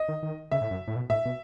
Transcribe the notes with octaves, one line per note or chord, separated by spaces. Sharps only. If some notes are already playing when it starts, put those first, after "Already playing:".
Already playing: D#5
D#3
D#3
C#3 E5
A2
F#2
A2
B2
A2 E5
B2